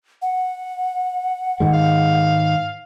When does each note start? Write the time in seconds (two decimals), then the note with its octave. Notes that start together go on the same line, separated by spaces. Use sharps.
0.22 F#5
1.60 G#2 D#3 G#3
1.73 F5